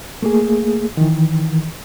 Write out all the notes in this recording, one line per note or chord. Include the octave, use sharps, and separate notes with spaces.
A3 A#3 G#4
D#3 E3